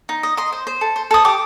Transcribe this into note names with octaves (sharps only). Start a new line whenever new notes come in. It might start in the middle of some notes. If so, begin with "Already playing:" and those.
D#4
D#5
D#5 C6
C5
C5
A4
C5
A4 D#6
G4 D6